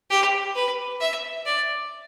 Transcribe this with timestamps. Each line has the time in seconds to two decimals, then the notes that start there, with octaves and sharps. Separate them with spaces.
0.10 G4
0.56 B4
1.01 E5
1.46 D5